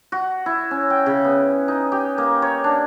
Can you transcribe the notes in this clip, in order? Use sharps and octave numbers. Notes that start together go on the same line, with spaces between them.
F#4
E4
C#4
G5
C#3
B3
D#4
G4
A#3
C#5
D4